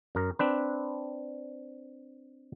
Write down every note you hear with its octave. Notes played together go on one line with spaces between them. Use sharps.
F#2 A#4
C4 D4 B4